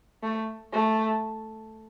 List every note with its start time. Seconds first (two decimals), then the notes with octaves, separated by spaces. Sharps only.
0.23 A3
0.72 A3